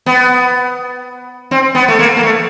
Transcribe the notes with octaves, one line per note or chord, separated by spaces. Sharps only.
B3
C4
B3
A3
A#3
A#3
A3